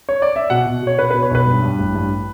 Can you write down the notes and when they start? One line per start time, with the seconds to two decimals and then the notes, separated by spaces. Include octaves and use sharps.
0.09 C#5
0.22 D5
0.36 E5
0.50 B2 F#5
0.66 B2
0.82 B2 C#5
0.98 B2 B4
1.11 B2 B4
1.23 C#5
1.31 B1 B4
1.46 G2
1.62 G2
1.79 A1
1.95 G2